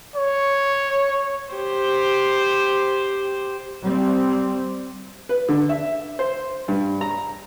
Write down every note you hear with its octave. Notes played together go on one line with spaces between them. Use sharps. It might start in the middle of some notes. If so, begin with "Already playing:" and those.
C#5
G4 C5
G3 C4
B4
D3
E5
C5
G2
A#5